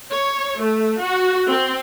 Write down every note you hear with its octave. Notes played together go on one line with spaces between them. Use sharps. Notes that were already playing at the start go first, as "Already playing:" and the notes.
C#5
A3
F#4
C4